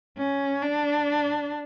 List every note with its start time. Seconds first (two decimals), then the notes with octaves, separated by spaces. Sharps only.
0.18 C#4
0.63 D4